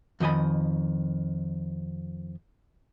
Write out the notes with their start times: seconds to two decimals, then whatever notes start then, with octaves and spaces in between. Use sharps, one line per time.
0.20 F2 D#3 D#5 G#5 B5